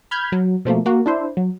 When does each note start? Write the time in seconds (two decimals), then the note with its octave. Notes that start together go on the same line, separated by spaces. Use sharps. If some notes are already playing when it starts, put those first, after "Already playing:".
0.11 B5 F6 G6 G#6
0.32 F#3
0.65 B2 F3 A3 A#3
0.86 A#3 F#4
1.06 D4 E4 C5
1.37 F#3